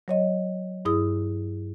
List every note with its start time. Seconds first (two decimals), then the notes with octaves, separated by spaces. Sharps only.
0.08 F#3 C#5 D#5
0.85 G2 E4 G#4 D#6